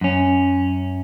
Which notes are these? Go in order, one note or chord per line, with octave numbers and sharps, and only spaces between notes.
F#2 C#4